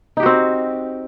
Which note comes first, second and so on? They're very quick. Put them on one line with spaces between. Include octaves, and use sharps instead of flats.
D#4 G4 F#4 C4